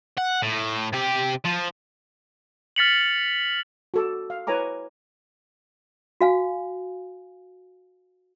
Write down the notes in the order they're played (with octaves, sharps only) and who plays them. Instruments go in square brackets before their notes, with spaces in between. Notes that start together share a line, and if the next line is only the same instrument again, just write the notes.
[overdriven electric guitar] F#5
A2
C3 G4
F3
[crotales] F6 A6 B6 C#7 F7 F#7
[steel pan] F#4 A4 D6
F5
E4 B4 C#5 G#5 A#5 D6
[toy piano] F#4 F5 G#5